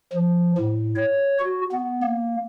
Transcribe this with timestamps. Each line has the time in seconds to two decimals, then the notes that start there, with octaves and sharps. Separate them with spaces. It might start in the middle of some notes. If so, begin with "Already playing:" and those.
0.13 F3
0.58 A2
0.96 C#5
1.39 F#4
1.71 B3
2.02 A#3